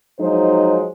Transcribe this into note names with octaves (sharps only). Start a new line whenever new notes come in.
F3 F#3 G#3 D#4 C5